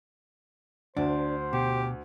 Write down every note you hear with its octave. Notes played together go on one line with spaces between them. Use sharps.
D2 D4 C5
B2 G4